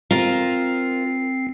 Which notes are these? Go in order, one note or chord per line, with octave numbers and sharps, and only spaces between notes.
C4 F4 A#4 C5 C7